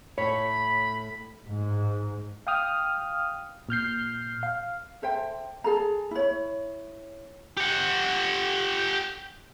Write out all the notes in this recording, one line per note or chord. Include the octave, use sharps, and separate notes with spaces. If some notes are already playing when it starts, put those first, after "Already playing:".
A2 A4 C#5 B5
G#2
F5 G5 D#6 F6
A#2 F6 G6 C7
F5
A4 C5 E5 G5
G#4 A4 A#5
E4 C#5
G4 F#5